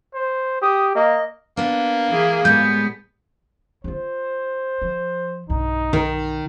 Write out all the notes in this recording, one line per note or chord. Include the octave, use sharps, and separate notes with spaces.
C5
G4 D#6
A#3 D#5
A#3 B3 D4
E3 G#4
A2 G3 G#3 B3 G6
E4 F4 C5
F3
B1 G2 D#4
D#3